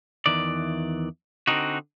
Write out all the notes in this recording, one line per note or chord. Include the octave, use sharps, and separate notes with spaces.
E2 D#3 E3 D5
D3 C4 D4 D#4 F#4